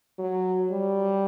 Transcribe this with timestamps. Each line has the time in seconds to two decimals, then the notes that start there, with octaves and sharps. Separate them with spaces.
0.19 F#3
0.71 G3